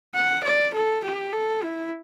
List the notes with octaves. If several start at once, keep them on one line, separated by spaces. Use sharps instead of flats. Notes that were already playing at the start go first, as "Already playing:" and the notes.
F#5
D5
A4
G4
A4
E4